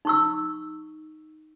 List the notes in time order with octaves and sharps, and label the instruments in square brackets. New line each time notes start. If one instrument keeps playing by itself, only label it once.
[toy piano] D#4 C#6 E6